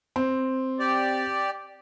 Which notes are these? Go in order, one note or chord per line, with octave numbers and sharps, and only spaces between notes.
C4
G4 D5